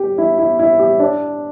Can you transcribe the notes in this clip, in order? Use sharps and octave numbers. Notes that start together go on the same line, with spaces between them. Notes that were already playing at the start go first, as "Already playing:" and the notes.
Already playing: G4
E4
E4
E4
G4
D4 D5